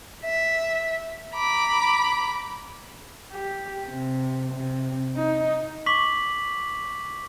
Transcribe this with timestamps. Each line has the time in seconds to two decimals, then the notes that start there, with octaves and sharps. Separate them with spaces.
0.24 E5
1.35 A#5 B5 D6
3.32 G4
3.87 C3
4.53 C3
5.16 D#4
5.86 C#6 D6 B6 F#7